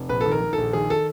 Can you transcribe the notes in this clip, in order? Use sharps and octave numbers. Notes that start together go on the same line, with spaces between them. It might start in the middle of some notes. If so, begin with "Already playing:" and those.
Already playing: F1
A#1 B4
A4
D#3
A#4
D#3
A#1 A4
D#3 G#4
A4